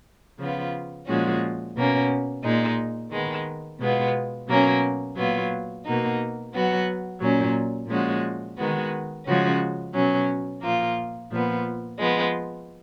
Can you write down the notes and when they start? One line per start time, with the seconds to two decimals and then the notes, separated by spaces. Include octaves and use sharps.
0.39 C#3 F3 B3 F4
1.07 A#2 F3 G#3 C#4 F#4
1.76 B2 A#3 C#4
2.43 A#2 G#3 D#4
3.11 D#3 G#3 B3
3.80 B2 G#3 B3 F4
4.48 B2 F#3 A#3 C#4
5.17 A#2 F#3 B3 F4
5.85 B2 A#3 D#4 F#4
6.53 F#3 B3 F#4
7.21 A#2 F#3 C#4
7.89 A#2 F3 G#3 C#4 F#4
8.57 D#3 G#3 B3 F#4
9.26 C#3 F3 G#3 C#4 F#4
9.93 B2 F#3 C#4
10.62 A#2 F3 A#3 F4
11.30 A#2 F3 B3
11.98 F3 G#3 B3